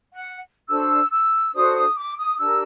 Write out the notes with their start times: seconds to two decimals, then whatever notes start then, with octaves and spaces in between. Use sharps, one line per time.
0.12 F#5
0.68 D4 F#4 A4 C5 E6
1.11 E6
1.52 D4 F#4 A4 C5 D#6
1.74 D#6
1.95 D6
2.17 D#6
2.38 D4 G4 A#4 E6